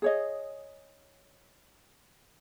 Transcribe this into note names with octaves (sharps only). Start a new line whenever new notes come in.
G#4 C#5 D#5